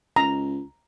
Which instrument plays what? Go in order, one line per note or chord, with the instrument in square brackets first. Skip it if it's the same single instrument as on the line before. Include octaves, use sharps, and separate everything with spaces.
[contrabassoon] C#2 [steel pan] A#5